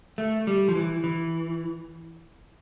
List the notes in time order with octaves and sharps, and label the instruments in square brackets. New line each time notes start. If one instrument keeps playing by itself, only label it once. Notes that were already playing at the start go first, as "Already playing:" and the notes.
[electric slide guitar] A3
G3
F3
E3
E3